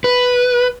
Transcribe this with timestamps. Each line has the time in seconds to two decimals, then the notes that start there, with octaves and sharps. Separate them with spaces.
0.04 B4